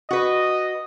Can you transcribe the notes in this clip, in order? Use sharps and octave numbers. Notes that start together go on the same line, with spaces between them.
F#4 B4 D#5